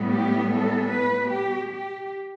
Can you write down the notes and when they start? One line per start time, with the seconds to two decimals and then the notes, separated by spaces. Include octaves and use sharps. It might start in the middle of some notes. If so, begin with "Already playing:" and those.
Already playing: A2 G3 B3
0.10 G4
0.51 A4
0.90 B4
1.30 G4
1.69 G4